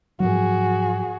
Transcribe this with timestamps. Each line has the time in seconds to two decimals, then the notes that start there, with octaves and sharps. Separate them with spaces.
0.20 G#2 F3 F#3 F#4 G#4